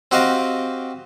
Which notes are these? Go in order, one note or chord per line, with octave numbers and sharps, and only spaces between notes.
C4 F#4 G4 D#5 F5